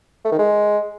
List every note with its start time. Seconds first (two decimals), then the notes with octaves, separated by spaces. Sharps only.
0.25 A3
0.32 D#3
0.39 G#3